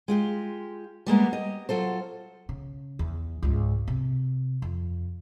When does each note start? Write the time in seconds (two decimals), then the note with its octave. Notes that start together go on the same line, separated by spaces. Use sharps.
0.08 G#3 F4 G4
1.06 G3 G#3 A#3 B3
1.32 G4 D#5
1.69 F#3 F4 A4 C5
2.49 C#3
2.99 E2
3.43 C#2 G#2
3.88 C3
4.62 F2